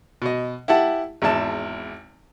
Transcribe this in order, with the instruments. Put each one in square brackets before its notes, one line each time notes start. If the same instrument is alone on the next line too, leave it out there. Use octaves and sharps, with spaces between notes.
[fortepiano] B2 D#5
E4 G4 E5 F#5 A5
G#1 E2 E5 A5